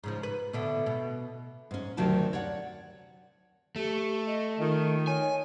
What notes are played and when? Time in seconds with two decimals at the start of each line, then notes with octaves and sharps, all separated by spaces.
0.04 G#2 C#3 F3
0.23 B4
0.53 B2 D3 E4
0.86 B2
1.71 G#2 C#4
1.97 D2 C3 D#3 F#3 G4 A5
2.33 C#5 D5 F#5
3.76 A3 G4
4.27 D#5
4.60 D#3 F4
5.07 C#5 G#5